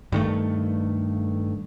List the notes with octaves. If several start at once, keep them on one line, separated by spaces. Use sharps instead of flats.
G2 D#3 A3